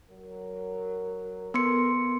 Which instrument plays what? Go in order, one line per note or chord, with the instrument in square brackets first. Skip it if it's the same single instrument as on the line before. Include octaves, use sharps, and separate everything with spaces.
[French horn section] F#3 A#4
[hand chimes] B3 C6 C#7 [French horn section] A4 A#4